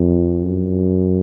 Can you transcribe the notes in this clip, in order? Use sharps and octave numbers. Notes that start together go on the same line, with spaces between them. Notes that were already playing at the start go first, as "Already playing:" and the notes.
Already playing: F2
F#2